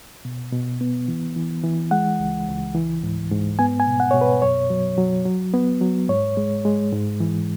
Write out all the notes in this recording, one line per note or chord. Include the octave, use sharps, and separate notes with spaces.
B2
B2
B3
E3
E3
E3
G#3 F#5
C#2
C#2
E3
G#2
G#2
B3 G#5
G#5
B2
F#5
B2 C#5
B4
F#2 C#5
F#3
F#3
F#3
B3
F#3
G#2 C#5
G#3
G#3
G#2
E3